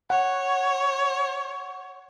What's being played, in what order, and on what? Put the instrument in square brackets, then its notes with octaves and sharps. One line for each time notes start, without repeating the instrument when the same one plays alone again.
[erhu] C#5 [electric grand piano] F#5